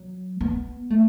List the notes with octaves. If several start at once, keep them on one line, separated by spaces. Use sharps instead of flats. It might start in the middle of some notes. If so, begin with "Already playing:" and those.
Already playing: F#3
B3
A3